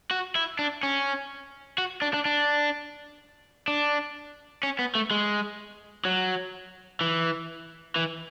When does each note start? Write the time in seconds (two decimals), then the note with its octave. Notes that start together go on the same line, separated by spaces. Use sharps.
0.11 F#4
0.35 E4
0.59 D4
0.83 C#4
1.78 F#4
2.02 D4
2.14 D4
2.26 D4
3.68 D4
4.63 C#4
4.79 B3
4.95 A3
5.11 G#3
6.05 F#3
7.01 E3
7.96 E3